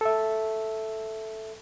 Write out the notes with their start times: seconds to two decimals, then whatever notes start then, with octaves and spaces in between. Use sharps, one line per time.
0.01 A4 E5